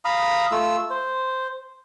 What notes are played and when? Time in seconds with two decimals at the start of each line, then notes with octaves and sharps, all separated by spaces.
0.05 F5 A#5 B5 D#6
0.51 A3 F4 E6
0.90 C5